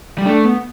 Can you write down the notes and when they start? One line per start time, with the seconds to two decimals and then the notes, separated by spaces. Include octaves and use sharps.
0.18 G3
0.25 A3 D4
0.45 B3